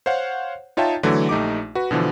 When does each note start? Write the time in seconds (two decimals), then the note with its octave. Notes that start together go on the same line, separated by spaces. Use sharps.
0.06 C5 C#5 F5 F#5
0.77 D#4 F4 C#5 E5 G5 A5
1.03 D3 E3 F#3 A3
1.29 A#1 A3 D#4 G4 D6
1.75 F#4 B4
1.91 B2 D3 E3 F3